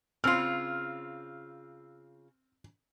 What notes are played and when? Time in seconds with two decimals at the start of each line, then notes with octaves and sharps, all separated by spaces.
0.24 C#3 C4 F4 E6 F6 C7